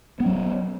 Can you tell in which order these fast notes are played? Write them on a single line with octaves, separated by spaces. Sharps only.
B3 C#4 F#3